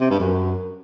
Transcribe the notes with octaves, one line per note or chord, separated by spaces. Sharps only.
C3
G2
F#2